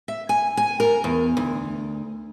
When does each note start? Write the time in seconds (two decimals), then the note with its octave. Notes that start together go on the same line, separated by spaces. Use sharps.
0.08 E5
0.29 G#5
0.57 G#5
0.80 A#4
1.04 E2
1.37 D2